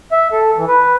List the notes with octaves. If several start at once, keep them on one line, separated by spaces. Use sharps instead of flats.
E5
A4
E3
B4